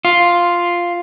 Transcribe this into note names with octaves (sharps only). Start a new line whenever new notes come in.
F4